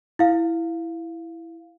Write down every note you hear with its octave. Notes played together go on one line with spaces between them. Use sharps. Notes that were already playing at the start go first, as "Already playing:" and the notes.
E4 F5